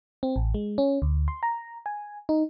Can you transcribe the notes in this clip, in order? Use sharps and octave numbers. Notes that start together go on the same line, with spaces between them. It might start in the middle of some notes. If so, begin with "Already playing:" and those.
C4
A1
G#3
C#4
D2
C6
A#5
G#5
D#4